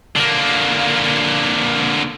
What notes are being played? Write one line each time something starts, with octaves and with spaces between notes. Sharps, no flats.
D3 A#3